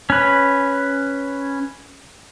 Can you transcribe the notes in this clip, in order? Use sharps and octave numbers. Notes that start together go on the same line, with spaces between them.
C#4 B4